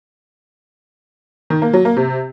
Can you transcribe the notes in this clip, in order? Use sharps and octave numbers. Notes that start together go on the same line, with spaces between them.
D#3
A#3
F#3
A#3
C3